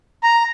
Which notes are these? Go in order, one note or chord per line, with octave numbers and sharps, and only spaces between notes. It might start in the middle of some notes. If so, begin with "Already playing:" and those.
A#5